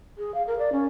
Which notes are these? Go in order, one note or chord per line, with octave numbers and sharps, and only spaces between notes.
G#4
F5
A#4
D5
C#4